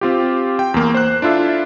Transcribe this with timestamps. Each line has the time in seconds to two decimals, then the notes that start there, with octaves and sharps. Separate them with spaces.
0.01 C4 F4 G4
0.59 G5
0.74 E2 A#3
0.94 C5 F#6
1.22 D4 E4 F4 A4 E5